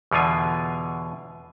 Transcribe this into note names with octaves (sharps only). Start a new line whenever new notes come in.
E2 B2 D3 F4 G#5